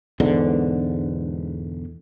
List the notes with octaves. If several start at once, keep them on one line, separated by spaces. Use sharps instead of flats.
E1 E2 G#2 D3